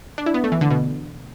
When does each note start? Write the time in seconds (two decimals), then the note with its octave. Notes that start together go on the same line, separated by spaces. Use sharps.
0.18 D4
0.26 E4
0.34 B3
0.44 A3
0.52 E3
0.61 D3
0.70 B2